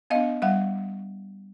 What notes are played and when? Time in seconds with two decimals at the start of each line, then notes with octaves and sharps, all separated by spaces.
0.10 B3 D4 D#5 F5
0.42 G3 E5 F#5